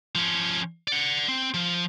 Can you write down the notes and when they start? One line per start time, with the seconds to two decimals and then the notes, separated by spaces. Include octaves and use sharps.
0.15 F3 C#4
0.88 D5 F#5
1.28 C4
1.54 F3